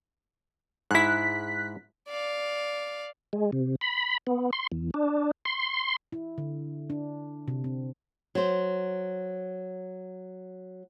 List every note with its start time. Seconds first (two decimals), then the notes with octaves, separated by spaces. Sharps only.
0.91 G#2 E4 F#6 B6
2.09 D5 F5
3.33 G#3
3.52 C3
3.81 B5
4.27 B3
4.53 C6
4.72 E2
4.94 D4
5.45 C6
6.12 E4
6.38 D3
6.90 D4
7.48 C3
7.64 C4
8.35 F#3 C5